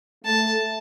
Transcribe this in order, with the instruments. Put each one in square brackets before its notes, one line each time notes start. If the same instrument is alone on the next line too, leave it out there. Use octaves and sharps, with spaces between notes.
[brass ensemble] A3 [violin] A5